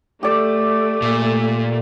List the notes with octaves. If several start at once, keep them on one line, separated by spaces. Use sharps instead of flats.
A3 G4 D5
A#2